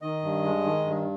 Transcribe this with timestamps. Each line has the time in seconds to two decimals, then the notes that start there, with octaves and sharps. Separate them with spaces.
0.02 D#3 D#5
0.22 G2
0.44 G#3
0.64 D#3
0.84 G2